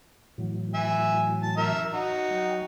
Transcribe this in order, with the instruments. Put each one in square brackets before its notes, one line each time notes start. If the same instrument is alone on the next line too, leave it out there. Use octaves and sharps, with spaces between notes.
[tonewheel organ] A2 E3 F#3
[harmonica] E5 G#5
A5
A#4 E5
D#4 F#4
[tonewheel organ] F#3 G5